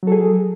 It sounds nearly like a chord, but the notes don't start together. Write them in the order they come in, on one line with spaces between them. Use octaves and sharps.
F#3 A4 G#4